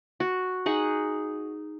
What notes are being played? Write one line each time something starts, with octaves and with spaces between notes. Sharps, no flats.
F#4
D#4 G#4 F#5